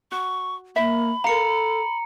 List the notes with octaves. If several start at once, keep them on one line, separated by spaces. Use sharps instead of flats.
F#4 C#6
A#3 E5 B5
A4 A#4 F5 A#5 C#7